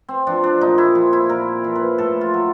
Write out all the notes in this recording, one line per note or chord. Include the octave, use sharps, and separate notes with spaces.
C4
F3 D4
D4
A#2 D#4
E4
F3
E4
A#2 A#4
F3
B4
A2 A4
F4
F#3